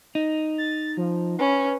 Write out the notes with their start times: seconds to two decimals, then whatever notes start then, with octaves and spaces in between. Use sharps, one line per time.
0.15 D#4
0.58 A6
0.97 F3
1.39 C#4 B4